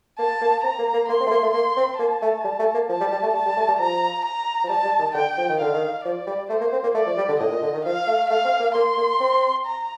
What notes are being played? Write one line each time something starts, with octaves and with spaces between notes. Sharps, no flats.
A#3 A5
A#3
C4 A#5
A#3
A#3
A#3 C6
C4
A3
A#3
A3
A#3 C6
C4
A#3 A5
A3
G3
A3
A#3
F3 A5
G3
G3
A3
G3 A5
G3
A3
G3
F3 A#5
A#5
F3
G3 A5
G3
D#3
D3 G5
F3
D#3
D3 F5
D#3
F3 D5
G3
A3 C5
A#3
C4
A#3
A3 D5
F3
G3
D3
A2 D#5
A#2
D3
D#3
F3 F5
A3
A3 F5
C4
A#3
A#3 C6
A#3
C4
A#5